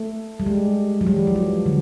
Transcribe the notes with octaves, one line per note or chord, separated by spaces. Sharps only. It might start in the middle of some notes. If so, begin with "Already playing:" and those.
Already playing: A3
G3
G#3
F#3
G3
E3
F3
F#3
D3